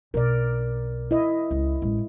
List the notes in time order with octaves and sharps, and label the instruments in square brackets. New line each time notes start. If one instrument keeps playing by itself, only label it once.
[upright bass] B1 [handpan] A#4 D5
[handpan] E4 D#5
[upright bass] C#2
A1 G#3